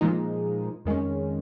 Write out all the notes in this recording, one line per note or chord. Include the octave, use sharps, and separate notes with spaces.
A#2 F3 G#3 D#4
F2 D#3 G#3 C#4